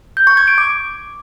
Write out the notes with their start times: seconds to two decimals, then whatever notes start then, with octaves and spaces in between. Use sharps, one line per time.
0.17 G6
0.27 C#6
0.37 G#6
0.48 D7
0.58 D6